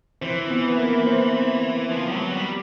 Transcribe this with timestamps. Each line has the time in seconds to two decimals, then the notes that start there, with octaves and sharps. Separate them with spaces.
0.21 E3 C4 C5
0.50 B3 B4
0.68 B4
0.78 A#3 A#4
1.06 C4 C5
1.91 F3
2.08 G3
2.12 F#3
2.33 G3